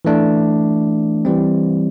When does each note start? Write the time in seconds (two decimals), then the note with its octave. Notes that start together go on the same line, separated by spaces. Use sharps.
0.05 E3 A3 D4
1.25 E3 G3 C4